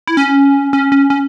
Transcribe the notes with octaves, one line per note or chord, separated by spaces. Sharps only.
E4
C#4
C#4
C#4
C#4